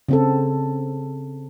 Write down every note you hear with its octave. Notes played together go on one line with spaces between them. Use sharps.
C#3 C4 A4